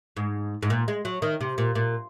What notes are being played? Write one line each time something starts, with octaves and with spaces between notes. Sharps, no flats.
G#2
G#2
A#2
G#3
F#3
D#3
C3
A#2
A#2